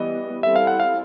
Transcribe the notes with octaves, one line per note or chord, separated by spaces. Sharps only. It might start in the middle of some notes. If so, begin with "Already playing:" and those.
Already playing: E3 G3 B3 D#5
G3 C4 E4 A4 E5
F5
F#5
F5